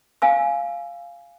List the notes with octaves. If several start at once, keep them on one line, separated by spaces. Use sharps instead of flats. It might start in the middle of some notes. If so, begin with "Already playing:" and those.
F5 G#5 E6